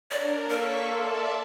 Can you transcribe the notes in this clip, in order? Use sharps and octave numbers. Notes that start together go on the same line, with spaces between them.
D4 A#4 C#5 D5
A#3 A4 A#4 C#5 C#6 B6
D5 E5 A5 C6